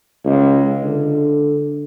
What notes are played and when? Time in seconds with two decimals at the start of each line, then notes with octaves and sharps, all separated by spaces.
0.25 C#2
0.83 D3